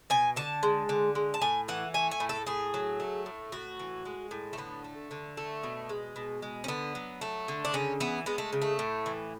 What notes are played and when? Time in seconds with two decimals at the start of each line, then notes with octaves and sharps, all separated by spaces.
0.10 B2 G#5
0.36 D3 A5
0.63 G#3
0.89 D3
1.15 G#3
1.34 A5
1.42 A2 G#5
1.68 E3 F#5
1.94 A3 G#5
2.11 G#5
2.20 A2
2.29 A4
2.47 A2 G#4
2.74 F#3
3.00 A3
3.26 A2
3.52 A2 F#4
3.79 E3
4.05 G#3
4.31 A2
4.53 A3
4.58 D3 B3
4.84 A3
5.11 D3
5.37 A3
5.63 B2
5.89 G#3
6.16 B2
6.42 G#3
6.64 C#4
6.68 D3 B3
6.95 F#3
7.21 A3
7.48 D3
7.65 D4
7.74 C#3 C#4
8.00 E3 B3
8.26 G#3 B3
8.38 A3
8.53 C#3
8.62 A3
8.79 A2
9.06 E3